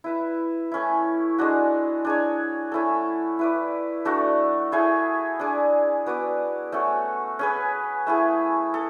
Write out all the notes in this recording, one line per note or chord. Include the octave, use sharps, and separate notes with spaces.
E4 B4 E5
A3 C#4 E4
G#3 D4 F#4
D4 G#4 C#5
A3 C#4 E4 A4
E4 B4 D5
A3 D4 F#4 A4
A3 E4 G#4 C#5
D4 G#4 D5
B3 F#4 B4 D5
A3 C#4 F#4 A4
C#4 G#4 B4
A3 E4 G#4
A4